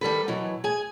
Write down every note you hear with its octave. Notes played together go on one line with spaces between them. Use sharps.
D#3 G3 A4 B4
B2 E3 F#3
G#4 G#5